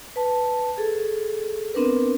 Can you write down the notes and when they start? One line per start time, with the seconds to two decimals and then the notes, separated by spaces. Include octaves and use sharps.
0.16 B4 A5
0.78 G#4 A4
1.74 B3 C4 D4 A#4 B4